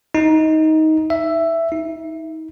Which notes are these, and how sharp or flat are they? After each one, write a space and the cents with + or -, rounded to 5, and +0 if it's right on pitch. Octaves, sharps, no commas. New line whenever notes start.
D#4 +15
E5 +10
D#4 +35